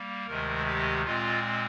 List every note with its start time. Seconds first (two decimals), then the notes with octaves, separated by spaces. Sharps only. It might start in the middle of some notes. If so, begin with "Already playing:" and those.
Already playing: G3 A#3
0.26 D2 C3 D#3 G#3 A#4
0.66 G4
1.04 A#2 G#3 C4 F4